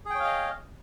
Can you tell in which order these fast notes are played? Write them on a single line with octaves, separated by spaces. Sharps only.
G#4 G5 C#5 F5 D#5